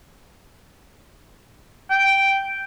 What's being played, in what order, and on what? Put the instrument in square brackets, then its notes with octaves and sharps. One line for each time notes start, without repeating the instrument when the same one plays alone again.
[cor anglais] G5